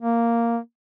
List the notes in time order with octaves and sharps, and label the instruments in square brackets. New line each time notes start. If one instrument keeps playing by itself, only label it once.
[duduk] A#3